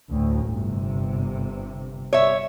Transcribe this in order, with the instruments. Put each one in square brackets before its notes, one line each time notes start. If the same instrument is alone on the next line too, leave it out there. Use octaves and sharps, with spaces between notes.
[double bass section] D2 A2
G1 C3
[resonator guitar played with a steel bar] C#5 E5